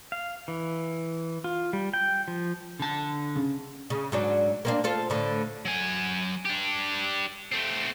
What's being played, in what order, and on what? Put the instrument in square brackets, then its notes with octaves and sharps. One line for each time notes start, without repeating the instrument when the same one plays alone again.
[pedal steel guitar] F5
E3
F4
G3
G5
F3
[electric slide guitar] D3 A5
[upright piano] C#3
[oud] C#3
G#2 F#3 D4
A#3 C4 D4
F4 A4 C5
A2 D3
[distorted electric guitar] F#3 G#5
D4 G4
A3 C4